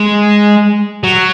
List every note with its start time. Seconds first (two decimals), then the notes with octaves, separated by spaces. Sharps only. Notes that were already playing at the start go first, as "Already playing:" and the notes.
Already playing: G#3
1.04 F#3